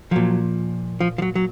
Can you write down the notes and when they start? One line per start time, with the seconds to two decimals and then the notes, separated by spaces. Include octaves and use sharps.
0.11 A#2 F3 F#3
1.00 F3
1.18 F3
1.22 F#3
1.35 F#3